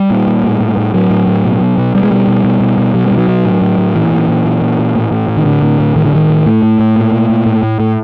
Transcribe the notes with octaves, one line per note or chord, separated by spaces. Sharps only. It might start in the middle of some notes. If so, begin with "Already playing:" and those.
Already playing: G3
A#2
A#2
A2
A2
A2
A2 F#3
A2
A2
B2
B2
B2
B2 G3
G#3
B2 G3
B2
B2
B2
B2
B2 F#3
G3
B2
F#3
B2
A2
A2
A2
A#2 E3
A#2
A#2
A#2
A#2
A#2
A2
A2
A2
D#3
A2 D3
A2
A2
A2 D#3
D3
A2 D#3
A2
A2 A3
A2
A2
A#2
A#2
A#2
A2
A2
A2